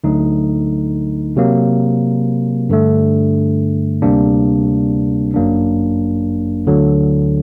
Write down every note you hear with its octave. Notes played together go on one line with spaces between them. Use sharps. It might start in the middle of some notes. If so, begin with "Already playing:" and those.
D2 D3 F#3 A3 D#4
C3 F#3 A#3
G2 D3 A3
D2 C3 G3 A#3 D4
G1 F#2 F#3 A#3 D4
D2 D3 F#3